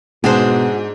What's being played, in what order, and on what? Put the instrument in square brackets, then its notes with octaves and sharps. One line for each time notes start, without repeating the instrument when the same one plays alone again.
[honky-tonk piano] G#2 [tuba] B2 [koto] G#3 D4 C5 [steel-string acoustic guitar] F#4 G#4